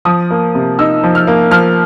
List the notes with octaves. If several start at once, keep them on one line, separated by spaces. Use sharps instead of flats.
F3 D#6
A#3
C3
D#4 E6
F3
F6
A#3
F3 F6